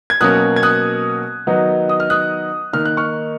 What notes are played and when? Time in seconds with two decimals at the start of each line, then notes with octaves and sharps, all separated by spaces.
0.10 G#6
0.21 B2 F#3 A#3 C#4 D#6 F#6
0.56 G#6
0.63 D#6 F#6
1.47 D#3 F#3 B3 D#4
1.89 D#6
2.00 F6
2.10 D#6 F#6
2.73 D#3 A#3 D#4 F6
2.85 F#6
2.97 C#6 F6